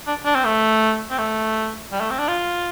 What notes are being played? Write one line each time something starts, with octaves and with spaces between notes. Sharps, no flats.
D4
D4
C4
A3
C4
A3
G3
A3
C4
D4
F4